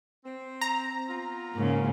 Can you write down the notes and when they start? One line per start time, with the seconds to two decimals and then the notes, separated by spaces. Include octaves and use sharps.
0.25 C4
0.61 A#5
1.08 B3 C4 F4
1.54 G#2 C#3 A#3